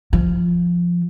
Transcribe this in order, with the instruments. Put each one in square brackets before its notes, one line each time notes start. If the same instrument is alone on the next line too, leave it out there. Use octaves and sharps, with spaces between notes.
[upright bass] F3